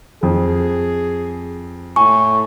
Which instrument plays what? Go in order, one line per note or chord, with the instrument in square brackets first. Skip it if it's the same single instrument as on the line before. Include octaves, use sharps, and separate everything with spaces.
[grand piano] F2 [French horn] G#4
[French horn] A2 [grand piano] G#5 [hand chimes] C#6